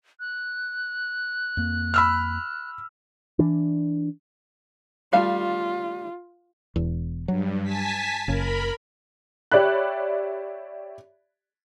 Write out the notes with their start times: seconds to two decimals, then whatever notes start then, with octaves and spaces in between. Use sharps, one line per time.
0.20 F#6
1.57 F2 A#3
1.94 B5 E6 F6
3.39 E3 D4
5.13 G3 A3 F4 F5
6.76 E1 E2
7.28 G2 F#3
7.63 G#5 A5 B6
8.28 F#1 C#3 A#4 B5
9.52 G4 C#5 D5 E5 B5 F#6